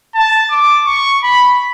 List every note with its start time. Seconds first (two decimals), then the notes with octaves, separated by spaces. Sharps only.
0.15 A5
0.50 D6
0.86 C#6
1.23 B5